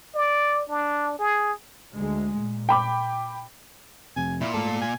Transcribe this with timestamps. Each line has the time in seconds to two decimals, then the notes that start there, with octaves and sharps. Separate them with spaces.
0.15 D5
0.69 D4
1.19 G#4
1.95 D2 G#3
2.37 A#2
2.69 G5 B5 D6
4.16 F2 C3 G#5
4.41 A#2 E4
4.54 G#2 A3 A4
4.82 G#5